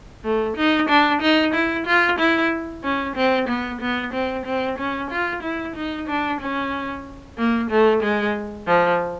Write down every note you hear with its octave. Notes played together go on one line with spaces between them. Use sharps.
A3
D#4
D4
D#4
E4
F4
E4
C#4
C4
B3
B3
C4
C4
C#4
F4
E4
D#4
D4
C#4
A#3
A3
G#3
F3